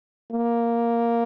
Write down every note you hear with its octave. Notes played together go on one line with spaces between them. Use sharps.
A#3